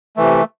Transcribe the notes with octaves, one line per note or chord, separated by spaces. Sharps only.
C3 E3 A3